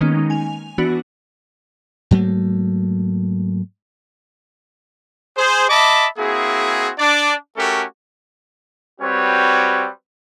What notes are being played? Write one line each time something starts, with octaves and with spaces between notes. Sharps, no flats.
D#3 G#3 A#3 B3 C#4 D#4
G#5 F7
E3 B3 D4 F#4
G#2 F#3 A3 A#3
G#4 C5
D#5 E5 A5 B5 D6
A#3 C4 E4 F#4 G#4
D4 D5
A3 C#4 F#4 G4 A4 A#4
G3 C4 F#4 B4 C#5